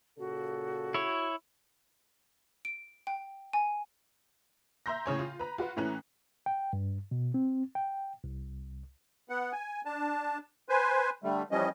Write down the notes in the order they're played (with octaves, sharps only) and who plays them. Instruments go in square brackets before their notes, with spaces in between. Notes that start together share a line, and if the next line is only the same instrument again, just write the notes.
[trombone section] A#2 C#3 A4 [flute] F#4
[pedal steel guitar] E4 C#5
[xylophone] D7
G5
G#5
[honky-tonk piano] E5 A#5 C6 G6 A#6
A2 C#3 C#5 G#5
F4
B4 A#5
F4 F#4 B4 F#5
A2 E3 A3 C#4 A#5 F#6
[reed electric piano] G5
G2
B2
C4
G5
C2
[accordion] B3 F#5
G#5
D4 A5
B4 C5 G#5
D3 G3 A3
E3 F3 G3 C#4 D#5